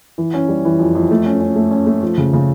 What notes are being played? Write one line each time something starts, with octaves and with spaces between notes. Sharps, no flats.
E3
C#4
G3
E3
F2
F2
A3
C#4
C#4
A3
C#4
A3
F3
C#3
C#3